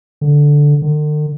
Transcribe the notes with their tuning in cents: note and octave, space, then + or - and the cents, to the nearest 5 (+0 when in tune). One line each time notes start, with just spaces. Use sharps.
D3 -5
D3 +45